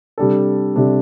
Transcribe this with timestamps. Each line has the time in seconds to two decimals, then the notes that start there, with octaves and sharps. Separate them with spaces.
0.18 C3 G3 D4 A4
0.75 C3 G3 D4 A4